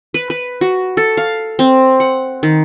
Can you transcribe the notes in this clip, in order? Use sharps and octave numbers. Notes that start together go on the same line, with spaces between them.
B4
B4
F#4
A4
F5
C4
F#5
D#3